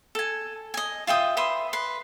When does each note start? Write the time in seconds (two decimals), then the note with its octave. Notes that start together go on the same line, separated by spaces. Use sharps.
0.15 A4 G#5
0.74 D#5 G#5
1.07 F4 E5 G5 D#6
1.37 B4 E5 C6 D#6
1.73 B4 C6